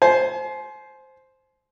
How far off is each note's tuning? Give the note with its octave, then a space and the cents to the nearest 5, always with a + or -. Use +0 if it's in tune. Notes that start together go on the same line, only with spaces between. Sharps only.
C5 +0 G#5 +40